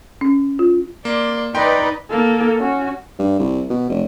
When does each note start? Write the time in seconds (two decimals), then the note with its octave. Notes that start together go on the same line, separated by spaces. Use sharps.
0.21 C#4
0.59 F4
1.05 A#3 D5 C6
1.55 D#4 B4 D5 D#5 G5 C6
2.10 A#3 A4
2.58 C#4 F#4
3.19 G2
3.40 C2
3.70 B2
3.90 F1